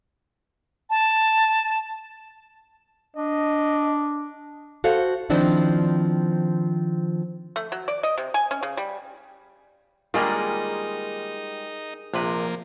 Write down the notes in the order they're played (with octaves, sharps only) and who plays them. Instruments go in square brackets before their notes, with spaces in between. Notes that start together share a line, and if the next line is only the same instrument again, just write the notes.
[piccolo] A5
[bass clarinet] D4 [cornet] D#5
[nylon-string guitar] F#4 A4 C5 F5
D#3 F3 C4 D4 E4
[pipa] A3
F#3
D5
D#5
C3
G#5
C#4
C#3
G3
[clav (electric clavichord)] D#3 A#3 [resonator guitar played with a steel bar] G3 G#3 F4 [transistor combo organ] D#4 [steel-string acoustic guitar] G#4 A#4
[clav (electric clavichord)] A#1 C3 B4 [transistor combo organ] F3 A#3